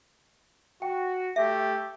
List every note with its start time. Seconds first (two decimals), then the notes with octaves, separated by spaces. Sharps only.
0.82 F#4 G5
1.36 A3 G4 E5